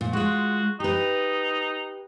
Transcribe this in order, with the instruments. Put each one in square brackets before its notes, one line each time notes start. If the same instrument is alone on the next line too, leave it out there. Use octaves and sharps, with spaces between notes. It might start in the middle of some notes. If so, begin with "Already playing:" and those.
[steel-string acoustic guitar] A#2
[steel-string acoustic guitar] G#3 F4 [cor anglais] F#4
[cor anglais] D#4 [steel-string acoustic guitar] G4 B4